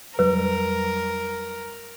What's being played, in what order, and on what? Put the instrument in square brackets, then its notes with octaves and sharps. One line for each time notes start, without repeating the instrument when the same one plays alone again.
[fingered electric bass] F2 F#3 G3 [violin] A#4 [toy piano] B4